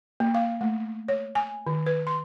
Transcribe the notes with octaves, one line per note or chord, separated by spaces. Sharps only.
A#3
F5
A3
C#5
G#5
D#3
B4
C6